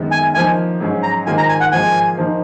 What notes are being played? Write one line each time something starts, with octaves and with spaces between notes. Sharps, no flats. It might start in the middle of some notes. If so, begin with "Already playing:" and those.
Already playing: F#2 D#3 G#3 B3
G#5
F3 A#3 D#4 G#5
G#2 F#3 C#4 G#4
A#5
G#2 D#3 A#3 F4 G#4 G#5
A#5
G#5
F#5
G#2 F3 A#3 F4 G#4 G#5
F3 A#3 D#4